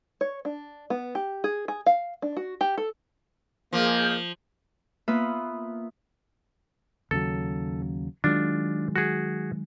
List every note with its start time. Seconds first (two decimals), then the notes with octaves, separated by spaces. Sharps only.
0.21 C#5
0.45 D4
0.90 B3
1.15 G4
1.44 G#4
1.68 G#4
1.86 F5
2.22 D4
2.37 F#4
2.61 G4
2.77 A4
3.73 F3 A#3 G#4 D#5 G6
5.08 A#3 B3 F4 B4 E5 D#6
7.11 D#2 C#3 F#3 A4
8.24 D#3 F#3 G#3 D4 F4
8.96 F#4 G#4